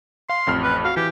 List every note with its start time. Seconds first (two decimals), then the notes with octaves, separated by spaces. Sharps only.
0.30 F5 C6
0.47 A1 F2 F6
0.63 B4
0.85 F#4 F5
0.97 E3 G4